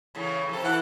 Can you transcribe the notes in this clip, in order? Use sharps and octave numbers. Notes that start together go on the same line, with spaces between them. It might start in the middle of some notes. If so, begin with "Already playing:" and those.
A2 C#3 E3
F2 C3 A4
E3 A4 F#5